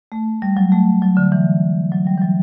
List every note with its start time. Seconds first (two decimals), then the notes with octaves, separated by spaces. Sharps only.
0.12 A3
0.42 G3
0.57 F#3
0.72 A3
1.02 F#3
1.17 D3
1.32 E3
1.92 F#3
2.07 G3
2.18 E3
2.22 F#3